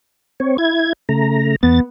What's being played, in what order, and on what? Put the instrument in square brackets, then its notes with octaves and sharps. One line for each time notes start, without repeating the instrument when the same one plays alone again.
[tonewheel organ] C4 C#5
E4 G#6
C#3 A3 A#5
[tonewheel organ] E2 A6 [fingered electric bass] B3